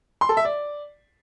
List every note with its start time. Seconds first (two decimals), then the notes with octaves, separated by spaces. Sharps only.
0.21 C6
0.29 A4
0.37 E5
0.45 D5